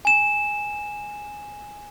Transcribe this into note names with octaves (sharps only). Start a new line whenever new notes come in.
G#5 E7